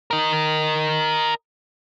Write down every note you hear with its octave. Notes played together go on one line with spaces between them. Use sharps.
A#4 D#5